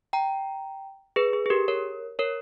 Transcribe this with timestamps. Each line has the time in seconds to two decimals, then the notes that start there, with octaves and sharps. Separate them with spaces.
0.13 G5 A#5
1.16 G#4 B4
1.33 G#4
1.46 G#4
1.50 G4 A#4
1.68 A#4 C#5
2.19 A#4 C#5